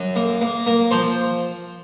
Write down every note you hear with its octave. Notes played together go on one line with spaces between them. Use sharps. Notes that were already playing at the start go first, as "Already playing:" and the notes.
Already playing: F#2
A#3
A#3
A#3
F3 C5